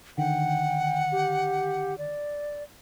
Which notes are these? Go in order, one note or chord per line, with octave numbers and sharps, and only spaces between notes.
D3 D#3 F#5 G5
G4
D5